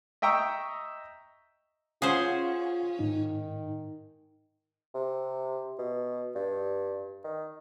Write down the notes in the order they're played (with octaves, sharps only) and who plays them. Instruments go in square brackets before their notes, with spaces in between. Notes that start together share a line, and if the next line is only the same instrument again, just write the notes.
[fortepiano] D#5 E5 G5 A#5 C#6 E6
[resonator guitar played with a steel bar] C#4 [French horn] F4 [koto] G#4 C5 [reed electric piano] F5 F#5
[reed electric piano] G#2 D#4 [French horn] D#3
[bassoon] C3
B2
G2
D#3